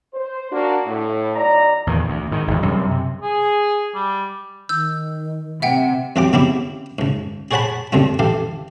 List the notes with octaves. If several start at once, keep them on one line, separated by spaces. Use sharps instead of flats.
C5
A#3 D4 F#4
A2
B1 D5 A#5
E2 A#2 D#3
D2
G#2 D#3
G#1 E2
F#2 C3 G3
C3
G#4
G3
D#3 E6 G6
C3 E5 F#5 G5
F2 E3 F#3 F4 G4 D6
C#3 B3 C4 D#4 E4 G4
C#2 G#2
G#4 C5 C#5 F#5 A5 B5
D2 G2 C#3 G3 C4 F4
E3 G4 A4 F5